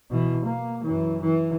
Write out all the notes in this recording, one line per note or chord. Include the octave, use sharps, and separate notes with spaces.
B2 E3
A#3
F#2 E3
E3